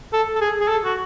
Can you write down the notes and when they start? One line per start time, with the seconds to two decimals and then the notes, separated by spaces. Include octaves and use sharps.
0.13 A4
0.36 A4
0.41 G#4
0.61 G#4
0.69 A4
0.85 F#4